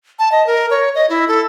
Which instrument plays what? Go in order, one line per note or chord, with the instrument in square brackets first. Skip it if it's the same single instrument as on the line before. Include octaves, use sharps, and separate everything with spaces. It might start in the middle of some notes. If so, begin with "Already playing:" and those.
[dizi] A5
D#5
A#4
C#5
D#5
E4
A4